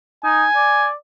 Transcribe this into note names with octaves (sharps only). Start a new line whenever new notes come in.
D#4 G#5
D5